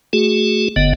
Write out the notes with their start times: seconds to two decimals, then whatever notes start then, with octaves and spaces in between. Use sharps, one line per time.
0.13 A3 F#4 G#4
0.76 F#1 D3 B3 D#5